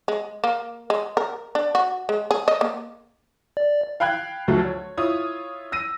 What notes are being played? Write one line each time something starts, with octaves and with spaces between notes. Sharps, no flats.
G#3
A#3
G#3
A#4
D4
F#4
G#3
G#4
D#5
A#3
D5
F5 G5 B5 F#6 G#6
D2 F3 F#3 A3
C#5
E4 F4 C#5 D#6
E6 A#6 D#7